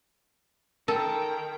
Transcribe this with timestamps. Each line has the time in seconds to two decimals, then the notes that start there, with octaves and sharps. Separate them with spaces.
0.88 D#3 A4 A#4 G5 A#5